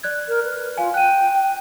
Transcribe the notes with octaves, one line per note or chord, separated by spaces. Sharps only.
D5 F#6 G#6
A#4
B4
F4 F5 G#5
G5 F#6 D#7